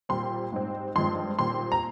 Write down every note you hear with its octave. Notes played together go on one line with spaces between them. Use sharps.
A#2 G3 C4 C6
G#2 G3 C4
G2 F3 G#3 C4 C6
A#2 G3 C4 C6
A#5